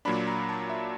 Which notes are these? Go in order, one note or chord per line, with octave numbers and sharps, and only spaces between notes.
A#2 F#3 A#3 D4 B5
A#5
A5
E5